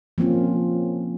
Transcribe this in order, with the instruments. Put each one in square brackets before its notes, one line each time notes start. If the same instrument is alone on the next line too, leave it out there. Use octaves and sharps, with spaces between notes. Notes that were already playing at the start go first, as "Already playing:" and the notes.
[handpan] F3 A#3 C4 C#4 F4